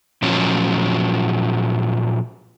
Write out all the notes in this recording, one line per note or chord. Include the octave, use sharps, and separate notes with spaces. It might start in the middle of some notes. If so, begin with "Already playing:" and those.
A#2 F3 F#3 C#4